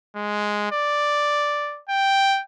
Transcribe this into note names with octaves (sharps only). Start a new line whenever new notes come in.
G#3
D5
G5